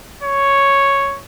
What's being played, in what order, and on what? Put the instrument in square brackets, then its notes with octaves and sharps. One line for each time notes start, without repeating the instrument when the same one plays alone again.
[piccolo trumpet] C#5